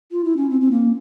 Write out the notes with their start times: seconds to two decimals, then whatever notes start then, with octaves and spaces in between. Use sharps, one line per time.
0.12 F4
0.25 E4
0.37 C#4
0.50 C4
0.61 C4
0.71 A#3